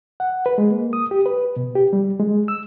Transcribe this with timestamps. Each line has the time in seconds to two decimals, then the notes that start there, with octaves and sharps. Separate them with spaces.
0.20 F#5
0.46 B4
0.58 G#3
0.71 A#3
0.93 D#6
1.11 G4
1.26 B4
1.56 B2
1.75 G4
1.93 G3
2.20 G#3
2.48 E6